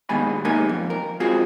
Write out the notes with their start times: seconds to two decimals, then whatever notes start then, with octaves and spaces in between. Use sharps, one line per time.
0.09 D#2 B2 D#3 G#3 G#5 B5
0.45 G#3 A#3 D#4 G4 A#4 G#5
0.69 F2
0.90 A#4
1.20 G#3 C4 F4 F#4 G#4